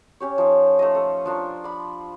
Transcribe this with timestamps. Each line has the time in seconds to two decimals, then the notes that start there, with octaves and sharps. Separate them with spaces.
0.20 C#4 G4 C#5
0.38 F3 D#4
0.79 A3 F4 D#5
0.95 A4
1.26 F3 D4 A#4 C#6
1.64 D5 B5